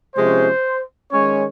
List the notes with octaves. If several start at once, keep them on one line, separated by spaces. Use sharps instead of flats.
C3 F3 G#3 C#4 C5
D#3 G#3 C#4 C#5